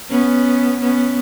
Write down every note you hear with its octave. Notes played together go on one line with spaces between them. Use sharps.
B3 C#4
B3 C#4